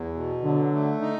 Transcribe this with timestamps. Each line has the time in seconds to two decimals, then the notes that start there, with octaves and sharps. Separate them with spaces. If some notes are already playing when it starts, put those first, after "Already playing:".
Already playing: E2
0.14 B2
0.43 D3 F#3
0.72 A3
1.01 D#4